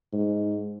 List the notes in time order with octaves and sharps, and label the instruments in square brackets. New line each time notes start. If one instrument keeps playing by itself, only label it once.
[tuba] G#2